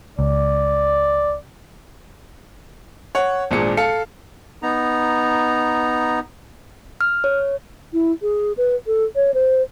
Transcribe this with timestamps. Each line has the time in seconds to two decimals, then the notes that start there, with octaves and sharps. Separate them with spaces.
0.19 C#2 D5
3.15 C#5 F#5
3.51 G#1 A#2 D4 G#4 C#7
3.77 A4 F5 C#7
4.62 B3 D#4 A#5
7.01 F6
7.24 C#5
7.93 E4
8.22 G#4
8.57 B4
8.87 A4
9.16 C#5
9.34 C5